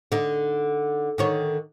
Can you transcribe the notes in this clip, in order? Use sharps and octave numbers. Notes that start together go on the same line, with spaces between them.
D3 D#4
D3 D#3 C#5